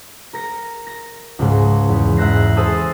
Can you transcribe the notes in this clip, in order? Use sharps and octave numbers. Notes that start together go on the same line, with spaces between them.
A#4 A#6 C#7
A#6
C#2 G#2
E2
G#2 E5 F#6 A#6 C7
G#4 A4 C5 A5 D#6 E6